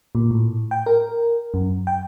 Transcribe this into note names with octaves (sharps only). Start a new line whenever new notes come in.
A#2
A2
G5
A#4
F#2
G5